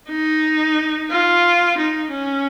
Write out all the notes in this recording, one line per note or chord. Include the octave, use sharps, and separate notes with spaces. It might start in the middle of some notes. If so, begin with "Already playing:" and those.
D#4
F4
D#4
C#4